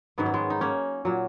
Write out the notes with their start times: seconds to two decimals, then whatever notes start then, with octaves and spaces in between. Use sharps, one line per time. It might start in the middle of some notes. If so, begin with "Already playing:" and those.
0.18 G#2 D#3 F#3 B3
0.26 C#4
0.34 G#3 B3
0.50 D#4
0.61 A#3 C#4
1.05 A#2 F#3